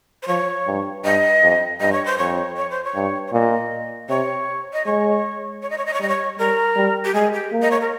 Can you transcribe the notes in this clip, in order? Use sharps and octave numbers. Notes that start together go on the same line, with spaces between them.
C5
F3 C#5
G2
G2 D#5
F2
G2 D#5
C#5
C5
F2 C#5
C#5
C5
C#5
G2
C#5
A#2 D#5
C3 C#5
D#5
G#3 C#5
C#5
D#5
C#5
D#5
C#5
G3 D#5
C#5
G3 A#4
G3
G4
G#3 G#4
G4
A#3
D#5
C#5
A#4